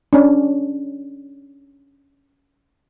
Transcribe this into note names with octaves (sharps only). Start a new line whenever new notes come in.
C#4 D4